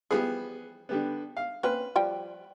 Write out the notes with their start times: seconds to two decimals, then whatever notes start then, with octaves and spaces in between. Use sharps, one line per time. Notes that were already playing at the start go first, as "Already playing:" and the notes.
0.11 E3 F3 G3 B3 G#4
0.89 D3 G3 B3
1.37 F5
1.63 A#3 C4 C#4 B4
1.96 F3 G3 G5